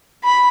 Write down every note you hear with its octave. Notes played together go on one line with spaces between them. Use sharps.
B5